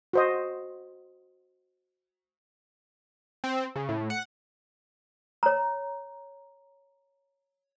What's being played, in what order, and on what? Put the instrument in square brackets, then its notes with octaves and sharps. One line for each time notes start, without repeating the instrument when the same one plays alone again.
[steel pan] F#4 C5 D#5
[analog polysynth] C4
C#3
A2
F#5
[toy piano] C#5 A#5